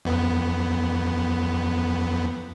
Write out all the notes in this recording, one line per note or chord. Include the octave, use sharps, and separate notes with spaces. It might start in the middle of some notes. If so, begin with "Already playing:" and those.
F2 B3